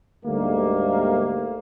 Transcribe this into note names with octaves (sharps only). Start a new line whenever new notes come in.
D2 G#2 G3 A3 A#3